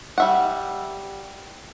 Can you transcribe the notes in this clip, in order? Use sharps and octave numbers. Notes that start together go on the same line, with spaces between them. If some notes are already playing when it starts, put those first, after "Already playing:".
G3 E5 F#5